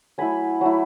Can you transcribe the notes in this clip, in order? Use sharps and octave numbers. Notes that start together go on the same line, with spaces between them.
F#3 A3 E4 G#5 B5
F#3 A3 E4